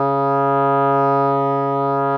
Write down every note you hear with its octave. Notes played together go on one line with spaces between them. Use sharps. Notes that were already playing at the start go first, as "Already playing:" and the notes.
Already playing: C#3